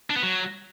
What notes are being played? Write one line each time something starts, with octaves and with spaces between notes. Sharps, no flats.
D4
B3
F#3